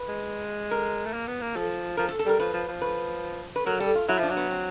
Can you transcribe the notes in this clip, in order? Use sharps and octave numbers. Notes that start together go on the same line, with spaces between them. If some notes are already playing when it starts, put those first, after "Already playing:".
Already playing: B4
G#3
A#4
A3
A#3
B3
A#3
F3 A4
F3 A#4
A4
A4
G3 A#4
F3 B4
F3
F3
B4
B4
F#3 A#4
G3 A4
F4
F#3 E4
F3 D4
F#3
B3
C4